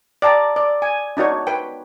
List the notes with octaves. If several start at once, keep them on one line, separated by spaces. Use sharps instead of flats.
D5 G5 A5 A#5
D5
G#5
D4 D#4 F#4 C#5
B4 G5